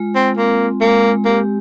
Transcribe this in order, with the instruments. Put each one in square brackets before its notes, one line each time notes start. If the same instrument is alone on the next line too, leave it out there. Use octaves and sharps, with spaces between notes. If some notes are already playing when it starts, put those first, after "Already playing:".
Already playing: [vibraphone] G#3 F4
[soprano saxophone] C4
[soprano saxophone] A#3 [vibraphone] C4
[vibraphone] G#3 [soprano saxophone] A#3
[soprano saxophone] A#3 [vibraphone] G4